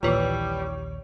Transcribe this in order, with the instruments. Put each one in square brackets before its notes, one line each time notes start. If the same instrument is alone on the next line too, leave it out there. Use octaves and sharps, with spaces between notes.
[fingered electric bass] A#1 D#2 [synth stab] A#2 E3 [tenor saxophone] G3 [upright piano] C#5